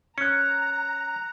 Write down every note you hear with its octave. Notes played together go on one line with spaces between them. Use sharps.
C#4 A#5 F#6 C#7